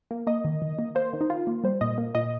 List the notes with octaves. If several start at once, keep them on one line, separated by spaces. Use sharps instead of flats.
A#3
A#3 D#5
D#3
D#3
A#3
A#3 C5
D#3
D#4
D#3 F4
A#3
G3 C5
A#2 D#5
A#3
A#2 D#5